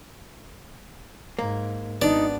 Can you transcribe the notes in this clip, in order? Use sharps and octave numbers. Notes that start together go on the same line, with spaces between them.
G#2 A#3
G#1 B3 D4 D#4 D5